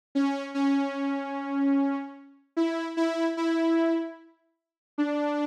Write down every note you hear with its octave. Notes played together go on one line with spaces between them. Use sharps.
C#4
C#4
E4
E4
E4
D4